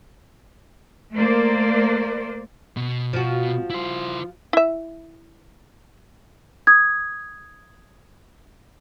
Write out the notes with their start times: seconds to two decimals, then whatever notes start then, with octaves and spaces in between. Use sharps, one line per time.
1.14 A3 A#3 A#4 C5 D5
2.77 B2
3.13 F3 F#4
3.70 E4 C5
4.53 E4 E5
6.67 D#6 G#6